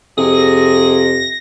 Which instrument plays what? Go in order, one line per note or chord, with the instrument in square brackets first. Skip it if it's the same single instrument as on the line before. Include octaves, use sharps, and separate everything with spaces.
[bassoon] F2 [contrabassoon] C3 [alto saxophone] G#4 [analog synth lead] A#6